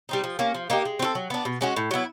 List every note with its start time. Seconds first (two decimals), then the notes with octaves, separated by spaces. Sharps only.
0.09 G3 C4 D#4
0.24 F3
0.39 A#3 C#4
0.55 F3
0.70 A#3 D#4 G4
0.85 G#3
0.99 C4 F4 A4
1.15 F#3
1.30 B3 D4
1.45 B2
1.61 G#3 C#4 F#4
1.76 A2
1.91 F#3 B3 E4